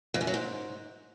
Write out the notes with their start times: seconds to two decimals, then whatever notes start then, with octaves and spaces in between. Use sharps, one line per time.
0.14 F2
0.21 F#2
0.27 F#3
0.34 G#2